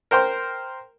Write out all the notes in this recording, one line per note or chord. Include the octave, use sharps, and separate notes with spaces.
A#4 C5 G5 C6